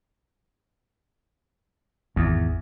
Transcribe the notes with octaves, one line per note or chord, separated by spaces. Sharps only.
G#1 E2